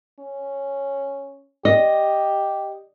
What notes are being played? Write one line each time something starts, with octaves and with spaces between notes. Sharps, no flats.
C#4
G4 D#5